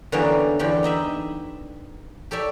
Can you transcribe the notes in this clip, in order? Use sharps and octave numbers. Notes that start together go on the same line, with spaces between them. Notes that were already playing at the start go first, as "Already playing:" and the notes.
D3 E3 G3 A#3 B3 C#4
E2 D3 G4 B5
D#4 D#5 E5 B5
G4 A4 C#5 D5 E5